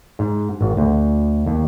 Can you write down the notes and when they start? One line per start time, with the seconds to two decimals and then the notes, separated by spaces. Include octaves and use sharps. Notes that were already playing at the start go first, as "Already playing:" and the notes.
0.19 G#2
0.61 G#1
0.77 D2
1.46 D#2